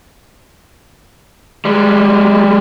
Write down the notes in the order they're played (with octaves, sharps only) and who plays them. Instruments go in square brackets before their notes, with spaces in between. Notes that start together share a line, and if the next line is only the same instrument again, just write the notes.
[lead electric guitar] G3 G#3